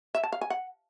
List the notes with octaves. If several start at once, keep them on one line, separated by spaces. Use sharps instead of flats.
E5
A5
F5
G#5
F#5